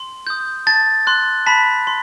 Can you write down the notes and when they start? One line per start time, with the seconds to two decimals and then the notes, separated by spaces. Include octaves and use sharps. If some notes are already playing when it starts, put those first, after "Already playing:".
Already playing: C6
0.27 D#6 G6
0.67 A5 A6
1.07 C6 F#6
1.46 A5 B5 B6
1.87 C6